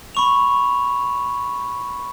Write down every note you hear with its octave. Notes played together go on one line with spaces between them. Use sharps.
B5 C#6 F7